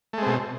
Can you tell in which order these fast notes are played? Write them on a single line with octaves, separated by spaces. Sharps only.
A3 G#3 C4 B2